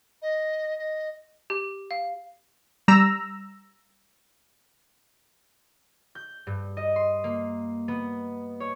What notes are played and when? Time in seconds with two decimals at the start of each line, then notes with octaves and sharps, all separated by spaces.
0.21 D#5
0.78 D#5
1.50 G4
1.91 F5
2.88 G3 A#5 E6
6.15 G6
6.47 G2
6.77 D#5
6.96 C6
7.24 A#3
7.88 B3
8.60 C#5